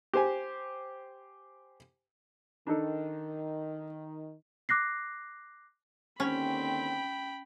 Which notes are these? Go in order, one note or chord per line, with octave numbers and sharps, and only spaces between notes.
G4 C5 G#5
D#3 D4 D#4 A4
D6 F#6 A#6 C7
D#2 D3 C4 C#4 G5 B5